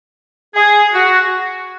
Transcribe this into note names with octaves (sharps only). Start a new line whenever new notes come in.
G#4
F#4